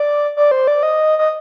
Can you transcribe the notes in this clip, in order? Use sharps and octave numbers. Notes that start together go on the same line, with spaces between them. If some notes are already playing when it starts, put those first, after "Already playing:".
Already playing: D5
D5
C5
D5
D#5
D#5